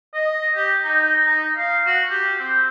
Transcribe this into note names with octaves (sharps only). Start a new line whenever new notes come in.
D#5
G4
D#4
D#4
F5
F#4
G4
C4